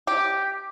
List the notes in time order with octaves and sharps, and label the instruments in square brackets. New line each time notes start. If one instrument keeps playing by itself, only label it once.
[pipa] G4